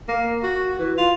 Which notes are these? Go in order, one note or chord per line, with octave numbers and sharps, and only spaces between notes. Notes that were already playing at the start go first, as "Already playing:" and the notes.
A#3
F#4
E3
F4